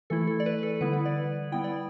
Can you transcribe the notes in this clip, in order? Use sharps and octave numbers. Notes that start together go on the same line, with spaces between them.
E3 A3 E4 A4
A4
D5
B4
A4
D3 G3 B3 E4 B4
B4
D5
G3 B3 E4 G5
D5